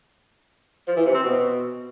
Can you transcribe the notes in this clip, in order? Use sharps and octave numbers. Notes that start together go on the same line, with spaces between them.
F3
E3
C3
C4
B2